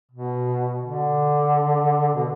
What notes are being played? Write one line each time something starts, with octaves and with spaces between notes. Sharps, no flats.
B2
D3
B2